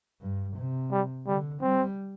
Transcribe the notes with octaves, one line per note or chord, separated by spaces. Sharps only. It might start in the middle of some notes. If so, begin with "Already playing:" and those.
G2
C3
G3
D3 G3
G3 C4